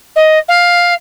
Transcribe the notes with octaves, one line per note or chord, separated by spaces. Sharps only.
D#5
F5